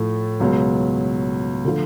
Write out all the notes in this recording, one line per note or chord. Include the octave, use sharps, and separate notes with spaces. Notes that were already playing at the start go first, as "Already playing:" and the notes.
Already playing: A2 F3 A3
C#2 B2 F#3
D3 F3 A3 F4